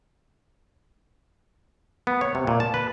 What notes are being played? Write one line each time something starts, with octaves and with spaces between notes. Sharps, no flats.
B3
C#5
C3
A#2
A5
B4